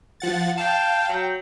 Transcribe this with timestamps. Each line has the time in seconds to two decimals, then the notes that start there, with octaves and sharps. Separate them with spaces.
0.20 F3 F#5 A6
0.58 F5 G5 A5
1.09 F#3